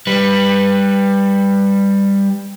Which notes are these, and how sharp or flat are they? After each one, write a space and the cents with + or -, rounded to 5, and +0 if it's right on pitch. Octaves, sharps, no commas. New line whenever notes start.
G3 +15 B4 +0